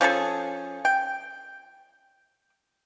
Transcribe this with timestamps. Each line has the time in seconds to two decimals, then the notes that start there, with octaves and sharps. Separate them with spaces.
0.01 F3 C#4 G#4 A4
0.85 G5